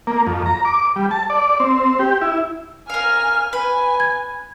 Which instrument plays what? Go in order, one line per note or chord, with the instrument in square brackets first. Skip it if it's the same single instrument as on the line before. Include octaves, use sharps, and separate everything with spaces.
[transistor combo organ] A#3
F2
A#5
D6
G3
A5
D5
C4
G4
E4
[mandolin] A#4 F5 [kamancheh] G#5 F6
[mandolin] B4 [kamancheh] G#5
[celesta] G#6